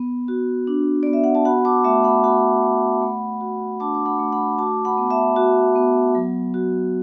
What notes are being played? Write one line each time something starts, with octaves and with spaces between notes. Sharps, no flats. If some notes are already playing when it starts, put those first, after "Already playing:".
Already playing: B3
F#4
D4
B3 D5
E5
F#5
A5
F#4 F#5 B5
A5 D6
A3 E5 A5
F#5 B5
F#4 F#5 B5
A3
A3
F#4
D4 A5 D6
D6
F#5 B5
A3
F#5 B5
F#4 A5 D6
F#5 B5
B3
E5 A5
F#4
B3
F#3
F#4